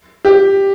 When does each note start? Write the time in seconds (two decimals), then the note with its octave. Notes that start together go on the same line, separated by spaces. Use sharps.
0.25 G4